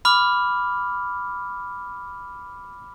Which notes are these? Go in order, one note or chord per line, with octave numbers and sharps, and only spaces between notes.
B5 D6 F6